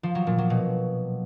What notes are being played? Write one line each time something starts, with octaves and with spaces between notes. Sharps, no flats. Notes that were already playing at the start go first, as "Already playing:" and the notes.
F3
F#3
A#2
F#3
B2